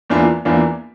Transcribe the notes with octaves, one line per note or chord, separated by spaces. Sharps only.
E2 E3 A#3 D4 F4
E2 E3 A#3 D4 F4